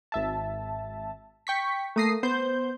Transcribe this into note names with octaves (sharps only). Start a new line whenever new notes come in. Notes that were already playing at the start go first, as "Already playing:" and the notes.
G#1 E5 A5
G5 C#6 B6
A3 A#3 D#6 A#6 C7
B3 C5 G6